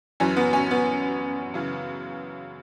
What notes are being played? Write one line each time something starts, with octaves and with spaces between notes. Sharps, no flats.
F#2 E3 C#4
B3
C#4
B3
F#2 C#3 E3